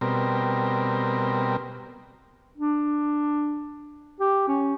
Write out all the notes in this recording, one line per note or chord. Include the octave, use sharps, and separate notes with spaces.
B2 G3 C4 A#4
D4
G4
C#4